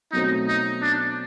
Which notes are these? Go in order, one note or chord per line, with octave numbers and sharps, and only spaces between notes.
B2 F#3 A3 C4 D#4
D#4
D4